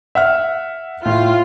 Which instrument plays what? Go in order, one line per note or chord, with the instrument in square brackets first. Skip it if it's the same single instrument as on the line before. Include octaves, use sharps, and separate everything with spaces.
[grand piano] E5 F#5 F6
[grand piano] A2 [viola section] F4